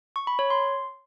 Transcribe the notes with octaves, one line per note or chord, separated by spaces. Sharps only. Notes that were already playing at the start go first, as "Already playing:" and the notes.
C#6
B5
C#5
C6